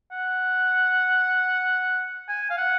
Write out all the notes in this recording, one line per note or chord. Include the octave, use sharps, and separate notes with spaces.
F#5
G#5
F5
F#5